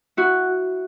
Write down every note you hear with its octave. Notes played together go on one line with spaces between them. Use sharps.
E4 F#4